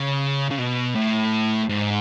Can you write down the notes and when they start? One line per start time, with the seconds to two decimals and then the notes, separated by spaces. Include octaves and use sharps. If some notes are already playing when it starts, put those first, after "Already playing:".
Already playing: C#3
0.51 C#3
0.58 B2
0.95 A2
1.69 G#2